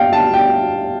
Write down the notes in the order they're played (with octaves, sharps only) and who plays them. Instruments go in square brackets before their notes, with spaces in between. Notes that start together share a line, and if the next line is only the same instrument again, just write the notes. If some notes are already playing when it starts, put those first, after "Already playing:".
Already playing: [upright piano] F5 G5
A5
G5